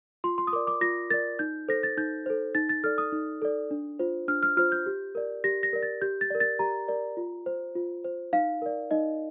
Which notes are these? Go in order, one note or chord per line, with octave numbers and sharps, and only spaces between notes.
F4 C6
C6
D#6
A#4 D5 D6
D6
F4 A#6
A#4 D5 A6
D#4 G6
A4 C5 A#6
A6
D#4 G6
A4 C5
D#4 A6
A6
A4 D5 F6
D#6
D#4
A4 D5
D4
F4 C5
D4 F6
F6
F4 C5 F6
G6
G4
A#4 D5
G4 A#6
A#6
A#4 D5
A6
G4 G6
A6
A#4 D5
A6
G4 A#5
A#4 D5
F4
C5
F4
C5
D#4 F5
A#4 D5
D#4 D#5